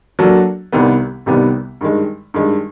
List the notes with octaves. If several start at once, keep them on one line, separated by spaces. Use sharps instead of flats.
F#3 A#3 D4 F#4 A4
C2 C3 D#3 G3 B3
C2 C3 D#3 G3 B3
G2 D#3 G#3
G2 D#3 G#3